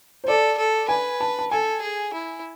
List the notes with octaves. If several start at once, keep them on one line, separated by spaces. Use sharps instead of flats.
C5
A4 D5
A4
B4 G#5
A5
A5
A4 G#5
G#4
E4